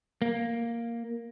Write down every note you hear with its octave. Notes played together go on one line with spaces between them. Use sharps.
A#3